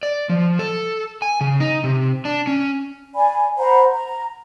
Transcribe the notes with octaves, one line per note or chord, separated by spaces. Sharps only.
D5
F3
A4
G#5
C#3
D#4
C3
D4
C#4
D5 G#5 B5
C5 F#5 A#5 B5
A#5